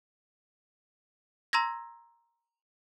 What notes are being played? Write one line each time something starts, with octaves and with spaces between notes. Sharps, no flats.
A#5 C6 E6 G#6 A#6